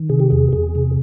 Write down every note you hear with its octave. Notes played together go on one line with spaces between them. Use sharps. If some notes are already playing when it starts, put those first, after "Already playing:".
Already playing: D#3
C3 G#4
G4
E2 G#4
E2 G#4
C3